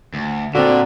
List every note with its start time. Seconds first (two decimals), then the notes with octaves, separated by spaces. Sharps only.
0.14 D2
0.55 A#2 D3 C4 F#4